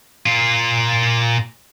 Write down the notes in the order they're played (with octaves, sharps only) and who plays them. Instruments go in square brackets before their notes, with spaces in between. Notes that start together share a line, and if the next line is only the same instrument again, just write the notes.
[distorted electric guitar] A#2 F4